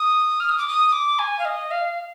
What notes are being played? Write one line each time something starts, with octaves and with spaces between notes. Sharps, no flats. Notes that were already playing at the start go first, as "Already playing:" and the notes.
Already playing: D#6
F6
D#6
D6
D#6
D6
G#5
F5
D#5
F5